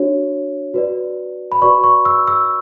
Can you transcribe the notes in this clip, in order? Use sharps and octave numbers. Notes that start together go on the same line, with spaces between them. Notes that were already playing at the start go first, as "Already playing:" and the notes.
Already playing: D4 F#4 C#5
F#4 B4 D5
B5
F#4 B4 D5 C#6
C#6
E6
E6